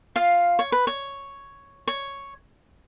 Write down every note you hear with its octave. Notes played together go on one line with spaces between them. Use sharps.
F4 F5
C#5
B4
C#5
C#5